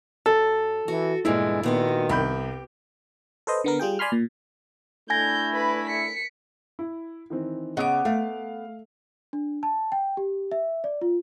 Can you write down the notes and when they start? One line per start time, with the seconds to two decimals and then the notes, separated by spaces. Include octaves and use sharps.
0.26 F#2 A4
0.88 E3 F#4
1.25 E2 G2 A#2 G#3 E4
1.63 A#2 D#3 B3 F#4
2.09 C2 G4 B5 G6
3.47 A4 B4 C5 D#5
3.64 D3 B3 A#4
3.79 G3 F4 G#4 G5
3.99 D5 G#5 B5 C6 F6
4.12 A#2
5.10 A3 D4 E4 G#5 G6 G#6 A#6
5.53 B4 B5
5.87 B6 C#7
6.79 E4
7.30 D#3 E3 C4
7.77 C#3 B3 D#5 D6 D#6
8.05 A3 F5
9.33 D4
9.63 A5
9.92 G5
10.17 G4
10.52 E5
10.84 D5
11.02 F4